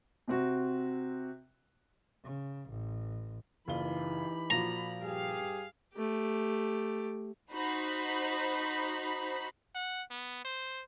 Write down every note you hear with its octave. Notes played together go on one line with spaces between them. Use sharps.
C3 C4 F#4
C#3
A1
F#1 E3 D#4 F4 G4 B5 G7
A#2 F3 F#4 A#5
G2 G4 G#4 F5
A3 G4
D#4 F#4 C5 B5
F#5
B3
C5